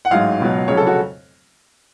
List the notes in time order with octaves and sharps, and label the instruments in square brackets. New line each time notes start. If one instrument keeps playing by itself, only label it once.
[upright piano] F#5
A1 G#2 F#3 F5
C#2 B2 F#3
F1 F2 C#3 F#3 C#5
A4
F#4